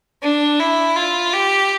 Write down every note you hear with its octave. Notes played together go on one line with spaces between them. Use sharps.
D4
E4
F4
G4